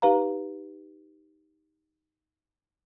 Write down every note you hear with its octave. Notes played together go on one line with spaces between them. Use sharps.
D#4 G4 B4 F5 A#5